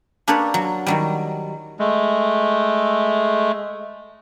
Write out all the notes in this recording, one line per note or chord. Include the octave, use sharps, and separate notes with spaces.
A#3 D4 G4 A4 B4 C#5
F#3
D#3 F#3 G3
G#3 A3